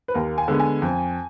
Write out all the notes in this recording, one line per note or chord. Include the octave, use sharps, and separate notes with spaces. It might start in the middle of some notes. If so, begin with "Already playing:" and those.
B4
D#2 A#4
G#5
D3 G#3 B3
G#5
F2